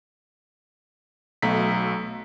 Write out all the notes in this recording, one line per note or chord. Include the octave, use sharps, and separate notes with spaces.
B1 A3 A#5 B6